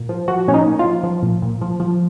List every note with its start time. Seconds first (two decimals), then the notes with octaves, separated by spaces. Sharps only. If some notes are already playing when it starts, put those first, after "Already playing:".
Already playing: A#2
0.09 F3
0.28 F3 F#4
0.48 A#2 C#4
0.54 D#4
0.66 A#2
0.79 F4
0.85 F3
1.04 F3
1.23 A#2
1.42 A#2
1.61 F3
1.80 F3